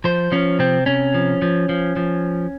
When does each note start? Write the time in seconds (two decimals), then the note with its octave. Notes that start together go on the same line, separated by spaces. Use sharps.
0.04 F3 C5
0.32 F3 C#4
0.59 C3 C4
0.86 C3 C#4
1.14 F3
1.42 F3
1.69 F3
1.96 F3